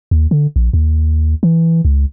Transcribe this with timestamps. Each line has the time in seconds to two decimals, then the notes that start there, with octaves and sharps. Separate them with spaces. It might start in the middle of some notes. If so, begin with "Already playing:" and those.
0.11 D#2
0.31 D3
0.56 A#1
0.73 D#2
1.43 E3
1.85 C#2